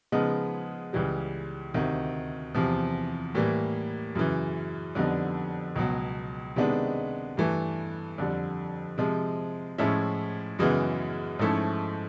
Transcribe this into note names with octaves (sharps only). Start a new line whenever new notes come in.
C#3 F3 G#3 B3 D#4
C#2 C#3 E3 G3
D2 C3 D#3
E2 C3 F3
A2 E3 G3 A#3
F#2 C#3 E3
F2 D3 G3 B3 D#4
C#2 B2 F#3
C3 D#3 G#3 B3 D4
G2 E3 A3
F2 D3 G3
C3 F3 G#3
A2 F3 G#3 C#4 E4
F#2 C#3 E3 G#3 B3
G#2 F3 A3 C#4 E4